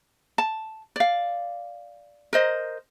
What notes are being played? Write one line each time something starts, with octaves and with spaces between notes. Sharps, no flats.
A5
D5 F5
A#4 C5 D#5